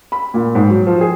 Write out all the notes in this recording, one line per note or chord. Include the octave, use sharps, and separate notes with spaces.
B5
A#2
G#2
F#3
F3
G#4